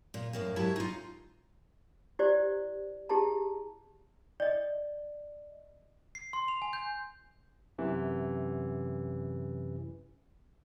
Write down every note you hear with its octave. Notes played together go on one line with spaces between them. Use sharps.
A#2
F#2 A2 A#3
G#2 F#3 E4 G4 C#5 A5
D#4 F4
E4 G4 C5 D5
E4 G4 G#4 A5 A#5
D5 D#5
C7
C6
F7
G#5
G6
F#2 C3 E3